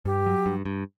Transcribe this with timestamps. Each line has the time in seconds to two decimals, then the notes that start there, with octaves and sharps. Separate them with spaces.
0.05 G2 G4
0.26 F#3
0.46 G2
0.65 G2